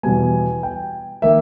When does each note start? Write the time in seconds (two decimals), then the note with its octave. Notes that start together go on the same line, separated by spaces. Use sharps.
0.03 E2 B2 G3 B3 G#5
0.63 G5
1.22 D#3 A#3 E5